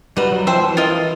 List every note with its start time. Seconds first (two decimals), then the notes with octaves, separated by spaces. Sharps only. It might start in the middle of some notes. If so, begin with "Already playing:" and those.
0.17 G3 D#4 F#4 B4
0.32 F#3
0.47 F3 C5 E5 G5
0.62 E3
0.77 F4 A#4 D#5